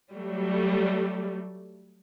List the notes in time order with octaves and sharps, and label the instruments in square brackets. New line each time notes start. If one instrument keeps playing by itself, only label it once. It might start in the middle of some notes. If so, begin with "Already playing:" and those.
[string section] F#3 G3 A3